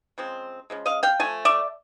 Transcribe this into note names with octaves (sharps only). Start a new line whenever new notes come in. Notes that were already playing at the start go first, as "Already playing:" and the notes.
C#3 F3 G#3 C4
C#3 F3 G#3
D#5 F5
F5 G5
F3 A3 G#5
D5 E5